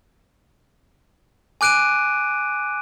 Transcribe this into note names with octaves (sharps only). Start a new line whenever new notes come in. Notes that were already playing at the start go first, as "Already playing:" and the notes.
G#5 D6 F#6 D7 D#7